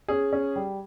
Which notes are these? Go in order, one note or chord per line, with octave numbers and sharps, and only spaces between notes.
C#4 G#4
C#4
G3